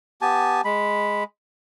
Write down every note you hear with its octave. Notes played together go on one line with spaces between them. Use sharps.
B3 G4 G#5 A5
G#3 B5